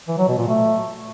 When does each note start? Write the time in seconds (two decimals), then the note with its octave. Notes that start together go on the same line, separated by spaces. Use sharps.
0.08 E3
0.18 F#3
0.28 B2
0.38 A#2
0.48 A3